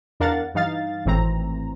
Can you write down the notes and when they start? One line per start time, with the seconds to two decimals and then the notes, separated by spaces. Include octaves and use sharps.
0.20 E2 D4 A#4 F5 F#5 A6
0.54 G2 E3 D#4 F5 A6
1.05 G#1 A2 E3 C4 A#5